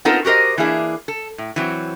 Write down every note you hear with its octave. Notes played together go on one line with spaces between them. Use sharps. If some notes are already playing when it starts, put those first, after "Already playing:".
B3 C4 D#4 F4 A4 A#4
F#4 G4 A#4 C5 D#5
E3 A#3 D4 E4 G#4
A4
A2
E3 F#3 C4